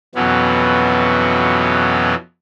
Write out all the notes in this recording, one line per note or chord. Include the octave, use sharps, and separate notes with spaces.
F2 B2 E3 F#3 B3 C#4